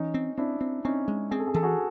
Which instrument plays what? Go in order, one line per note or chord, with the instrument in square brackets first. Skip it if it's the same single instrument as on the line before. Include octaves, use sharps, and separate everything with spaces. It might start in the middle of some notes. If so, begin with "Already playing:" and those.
Already playing: [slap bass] E3 [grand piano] C#4 D#4
[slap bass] C4
[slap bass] C4 [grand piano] D4 E4
[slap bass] C4
[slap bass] C4 [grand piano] C#4 D#4
[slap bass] G#3
[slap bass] C4 [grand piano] G#4
[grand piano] A4
G#4
[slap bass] E3 [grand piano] A4
[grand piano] F#4 G#4